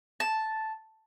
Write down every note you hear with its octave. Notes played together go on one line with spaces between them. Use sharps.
A5